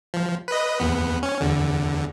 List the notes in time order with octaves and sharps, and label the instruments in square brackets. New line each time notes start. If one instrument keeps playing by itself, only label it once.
[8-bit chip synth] F3
B4 D#5
E2 B3
C#4
E2 D3